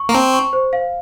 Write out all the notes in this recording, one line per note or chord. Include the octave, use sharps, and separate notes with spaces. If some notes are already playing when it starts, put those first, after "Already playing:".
Already playing: C#6
A#3
C4 A5
C#6
C5
F5